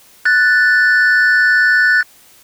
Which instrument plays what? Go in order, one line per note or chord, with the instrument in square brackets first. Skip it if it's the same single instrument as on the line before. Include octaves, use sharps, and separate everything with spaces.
[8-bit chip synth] F#6 A6